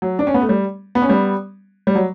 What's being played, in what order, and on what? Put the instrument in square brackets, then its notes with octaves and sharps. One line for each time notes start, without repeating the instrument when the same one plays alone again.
[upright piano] F#3
D4
C#4
B3
A3
G3
B3
C#4
G3 B3
G3
F#3